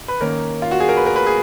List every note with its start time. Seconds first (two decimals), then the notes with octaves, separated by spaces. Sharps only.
0.08 B4
0.21 D#3 A#3 C#4 A#4
0.62 F4
0.71 F#4
0.80 G#4
0.89 A#4
0.97 B4
1.06 A#4
1.16 B4
1.26 G#4